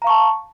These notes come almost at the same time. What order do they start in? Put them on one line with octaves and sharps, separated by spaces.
A#5 F5 C#6 A5